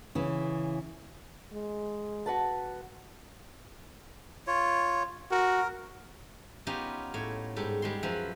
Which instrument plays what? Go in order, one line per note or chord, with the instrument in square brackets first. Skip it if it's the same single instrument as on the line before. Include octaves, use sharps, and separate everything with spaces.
[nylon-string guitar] C#3 E3
[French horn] G#3
[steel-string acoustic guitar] F#4 B4 A5
[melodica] F4 C#5
[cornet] F#4 [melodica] A#4
[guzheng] B3 C#4 D#4 F4 G4
A2 C#5
G#2 G3 A4
G3 G#3 C6
F#2 F3 B4 E5